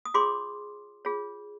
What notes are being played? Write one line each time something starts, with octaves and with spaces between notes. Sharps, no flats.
D#6
F4 G#4 C#5 C6 D6
F4 G#4 C#5